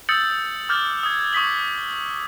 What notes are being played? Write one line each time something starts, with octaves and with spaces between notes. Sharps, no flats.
D#6 E6 G6 A6 C#7 F#7
D6 F6 G6 A6
D#6 G#6
C#6 D#6 B6 F#7